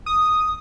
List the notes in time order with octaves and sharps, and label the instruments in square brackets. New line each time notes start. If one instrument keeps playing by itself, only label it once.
[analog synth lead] D#6